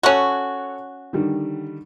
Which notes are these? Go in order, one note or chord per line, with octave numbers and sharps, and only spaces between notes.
C#4 F#4 A4 C#5 F#6
D3 D#3 G3